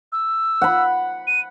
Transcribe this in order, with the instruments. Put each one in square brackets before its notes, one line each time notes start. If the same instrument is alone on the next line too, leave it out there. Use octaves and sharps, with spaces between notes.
[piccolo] E6
[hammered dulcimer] F#5 B5
[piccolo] D#7